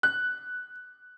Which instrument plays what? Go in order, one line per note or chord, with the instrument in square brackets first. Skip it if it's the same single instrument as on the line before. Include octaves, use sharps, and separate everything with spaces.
[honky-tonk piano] F#6